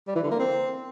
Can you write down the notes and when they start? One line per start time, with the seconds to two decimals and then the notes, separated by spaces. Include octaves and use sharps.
0.08 G3
0.16 E3
0.23 D3
0.31 A#3
0.39 C4